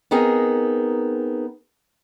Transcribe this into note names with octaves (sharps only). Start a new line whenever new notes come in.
B3 C4 D#4 G#4 A#4